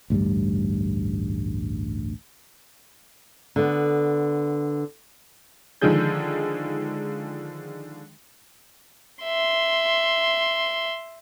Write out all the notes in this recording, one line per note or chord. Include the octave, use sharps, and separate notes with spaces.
A1 D2 G2 G3
D3 B3
D3 D#3 F3 G#3 G#4 G6
E5 C6